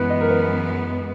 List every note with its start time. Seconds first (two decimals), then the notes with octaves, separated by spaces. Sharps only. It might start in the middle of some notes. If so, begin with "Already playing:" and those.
Already playing: F#2 E3 G#3 B3 B4
0.10 D#5
0.20 A#4
0.29 B4